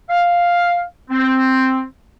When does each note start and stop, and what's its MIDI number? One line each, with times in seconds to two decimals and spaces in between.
0.10 0.82 77
1.11 1.82 60